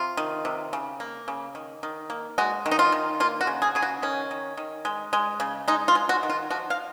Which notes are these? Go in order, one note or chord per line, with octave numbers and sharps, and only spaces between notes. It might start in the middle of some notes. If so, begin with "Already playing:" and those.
Already playing: C3 F4
D#3
C3
C#3
A#3
C#3
D#3
D#3
A#3
G#3 F#4
D#3
D#4
F4
D#3
A#3 F4
F#4
C#3
G#4
C#3 G#4
F#4
D#3 C#4
D#3
D#3
G#3
G#3
C#3
G#3 D#4
F4
G#3
F#4
D#3
F4
F3 F#4
F5